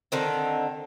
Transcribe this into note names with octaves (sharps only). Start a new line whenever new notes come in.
D3 D#3 C4